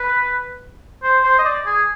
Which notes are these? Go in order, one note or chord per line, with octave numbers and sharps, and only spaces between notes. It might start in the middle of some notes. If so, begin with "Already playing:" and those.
Already playing: B4
C5
C5
D#5
D5
G#4